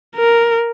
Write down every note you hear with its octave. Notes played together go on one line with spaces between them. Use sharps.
A#4